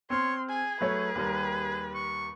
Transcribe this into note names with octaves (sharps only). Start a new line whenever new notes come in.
C4 C#5 C6 F6
G#4 G#5
F#3 A3 B4 C#5
D#2 G3 A#4
C#6